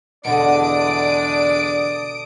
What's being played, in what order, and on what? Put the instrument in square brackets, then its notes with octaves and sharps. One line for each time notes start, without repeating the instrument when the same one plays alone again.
[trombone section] E2 D4 [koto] B2 D3 [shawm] D5 [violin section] D#6 D7